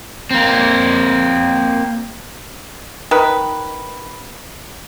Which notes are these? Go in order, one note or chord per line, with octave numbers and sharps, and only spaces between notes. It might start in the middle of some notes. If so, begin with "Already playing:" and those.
A#3 C4
D#3 B4